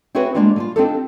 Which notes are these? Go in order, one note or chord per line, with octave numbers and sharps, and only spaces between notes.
C4 E4 F#4 G#4 B4 C#5
G3 G#3 A#3 D4 F4 F#4
D3 G3 F4
C4 D4 D#4 F4 G4 A4